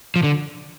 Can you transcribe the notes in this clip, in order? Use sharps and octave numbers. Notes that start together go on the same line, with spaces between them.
F3
D3